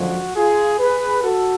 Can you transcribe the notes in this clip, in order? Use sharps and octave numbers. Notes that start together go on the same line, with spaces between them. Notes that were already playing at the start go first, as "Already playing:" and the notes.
Already playing: F#2 D3 F3 G#3 F#4
F4 G#4
G#4 B4
F#4 A4